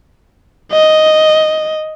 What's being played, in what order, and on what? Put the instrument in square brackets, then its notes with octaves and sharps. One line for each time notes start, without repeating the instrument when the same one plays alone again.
[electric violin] D#5